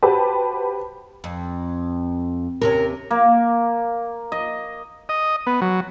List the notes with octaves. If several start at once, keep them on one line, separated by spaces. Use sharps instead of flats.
F#4 G4 B4 C5 G5 A5
F2
D#2 C3 C#4 A#4
A#3
D#5
D#5
B3
F#3